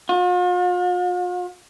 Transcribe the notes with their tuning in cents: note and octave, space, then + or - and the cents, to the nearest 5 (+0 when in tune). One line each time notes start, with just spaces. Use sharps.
F4 +45